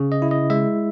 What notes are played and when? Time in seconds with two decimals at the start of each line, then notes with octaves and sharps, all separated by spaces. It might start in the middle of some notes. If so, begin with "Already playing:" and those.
Already playing: C#3
0.12 D#5
0.22 E4
0.31 D#5
0.50 G#3 E5